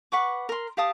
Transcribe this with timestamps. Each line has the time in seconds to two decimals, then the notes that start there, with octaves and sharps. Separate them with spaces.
0.12 B4 F#5 C#6 D6
0.49 A#4 C6
0.77 G4 F5 A5 D#6